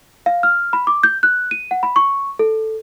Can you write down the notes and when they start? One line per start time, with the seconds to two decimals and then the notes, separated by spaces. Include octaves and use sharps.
0.26 F5
0.43 F6
0.73 B5
0.87 D6
1.03 G6
1.23 F#6
1.51 D#7
1.71 F#5
1.83 B5
1.96 C#6
2.39 A4